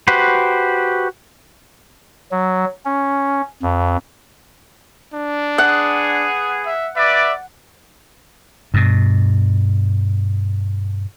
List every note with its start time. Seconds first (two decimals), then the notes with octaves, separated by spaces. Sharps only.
0.08 F#4 G4 B4 C5
2.31 F#3
2.85 C#4
3.62 F2
5.14 D4
5.58 B3 G#4 F#5
6.66 E5
6.96 B4 D5 E5
8.74 G2 B2